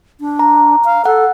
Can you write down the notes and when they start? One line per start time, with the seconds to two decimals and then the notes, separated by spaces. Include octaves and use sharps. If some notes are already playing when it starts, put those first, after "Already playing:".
0.20 D4
0.39 A#5
0.85 F5
1.05 A4 F#5